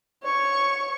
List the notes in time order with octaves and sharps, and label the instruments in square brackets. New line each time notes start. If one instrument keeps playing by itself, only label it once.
[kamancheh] C#5 C#6